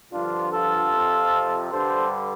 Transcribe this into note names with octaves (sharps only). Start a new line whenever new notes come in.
G2 D3 F3 D4 F4
F4 A4
F2 C3 F3
G2 D3 G3 A4 C5